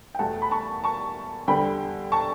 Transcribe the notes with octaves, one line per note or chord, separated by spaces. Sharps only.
G5
E2 B2 A3 F#5 A5
B5
A5 C#6
A5 C#6
E2 D3 G3 B3 G5 B5
A5 C#6